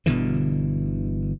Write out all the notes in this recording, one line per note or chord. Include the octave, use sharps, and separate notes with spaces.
G1 B2 D3 E3